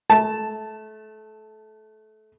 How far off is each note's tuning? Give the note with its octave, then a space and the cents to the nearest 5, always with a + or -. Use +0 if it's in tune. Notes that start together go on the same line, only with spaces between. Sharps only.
A3 -25 A5 +0